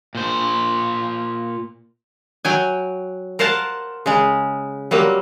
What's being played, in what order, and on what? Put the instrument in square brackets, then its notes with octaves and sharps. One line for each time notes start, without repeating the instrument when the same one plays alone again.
[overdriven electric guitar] A#2 C5
[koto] F#3 G5 G#5
A#4 C5 F5 F#5 A5
C#3 G#3
F#3 G3 A#3 C4